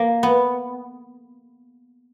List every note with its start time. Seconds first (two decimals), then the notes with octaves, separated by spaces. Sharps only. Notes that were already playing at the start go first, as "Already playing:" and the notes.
Already playing: A#3
0.23 B3